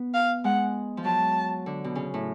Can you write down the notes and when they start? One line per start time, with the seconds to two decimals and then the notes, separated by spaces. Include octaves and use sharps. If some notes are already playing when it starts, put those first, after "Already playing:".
Already playing: B3
0.14 F5
0.44 G#3 F#5
0.97 F3
1.05 F#3 A5
1.66 D3
1.84 B2
1.95 C#3
2.14 A2